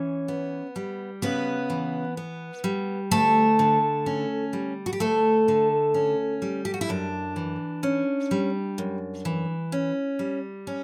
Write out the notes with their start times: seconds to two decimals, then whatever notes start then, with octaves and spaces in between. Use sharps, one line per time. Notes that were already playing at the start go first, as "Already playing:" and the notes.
Already playing: E3 C#4 C#5
0.28 B3
0.76 G3
1.22 C#3 B3 B4
1.70 E3
2.17 B3
2.64 G3
3.11 D2 A3 A4
3.59 D3
4.06 C#4
4.53 G3
4.86 F#4
4.93 G4
5.00 D2 A3 A4
5.48 D3
5.94 C#4
6.42 G3
6.65 G4
6.74 F#4
6.81 E4
6.89 F#2 D4
7.36 E3
7.83 C#4
8.31 G3
8.78 F#2
9.25 E3
9.72 C#4
10.19 G3
10.67 C#4